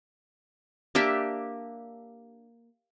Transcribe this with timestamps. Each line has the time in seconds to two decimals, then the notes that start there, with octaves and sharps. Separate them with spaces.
0.95 A#3 D4 G4 E5